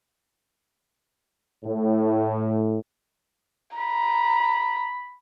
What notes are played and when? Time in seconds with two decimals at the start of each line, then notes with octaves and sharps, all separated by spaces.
1.64 A2
3.77 A#5 B5